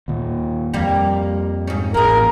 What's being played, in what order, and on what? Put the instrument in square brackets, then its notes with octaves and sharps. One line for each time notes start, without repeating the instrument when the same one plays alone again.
[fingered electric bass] D#2 A#2
[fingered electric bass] F2 [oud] G3 A#3
[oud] G#2 C#4
[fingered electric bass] A1 [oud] A#3 G#4 [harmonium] A#4